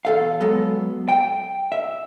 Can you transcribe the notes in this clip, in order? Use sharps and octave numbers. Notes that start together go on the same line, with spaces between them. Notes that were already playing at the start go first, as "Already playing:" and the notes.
E2 A4 F5
F#3 G#3 B3 A4
G5
E5